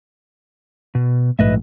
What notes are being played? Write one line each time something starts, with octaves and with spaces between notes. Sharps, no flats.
B2
A#1 G#2 A3 B4 D#5 E5